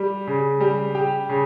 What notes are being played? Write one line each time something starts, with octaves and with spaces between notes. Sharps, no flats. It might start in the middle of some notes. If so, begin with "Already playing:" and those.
Already playing: G3
C#3
G3
G4
C#3